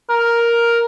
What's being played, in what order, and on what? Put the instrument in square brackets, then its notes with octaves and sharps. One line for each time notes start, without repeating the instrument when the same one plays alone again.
[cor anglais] A#4